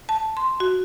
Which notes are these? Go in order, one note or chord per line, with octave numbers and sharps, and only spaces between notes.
A5
C6
F#4